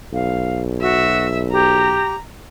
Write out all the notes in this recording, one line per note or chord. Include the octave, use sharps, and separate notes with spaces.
B1 F5
F#4 E5
G4 A#5